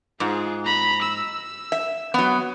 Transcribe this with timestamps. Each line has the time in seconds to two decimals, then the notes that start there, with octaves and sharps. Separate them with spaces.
0.20 G#2 F4 G#4
0.65 A#5 B5
1.01 E6
1.72 E5
2.14 F#3 B3